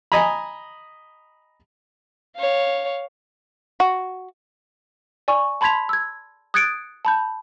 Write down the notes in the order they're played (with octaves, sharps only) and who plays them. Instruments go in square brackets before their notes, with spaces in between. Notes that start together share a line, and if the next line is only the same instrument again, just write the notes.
[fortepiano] D#5 G#5 A#5 B5
[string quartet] C#5 F5
[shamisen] F#4
[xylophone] D5 G#5 C#6
A5 B5 C6 G#6 B6 F7
E6 G#6
D#6 F#6 G#6 A6 C#7 D7
A5 B5 G6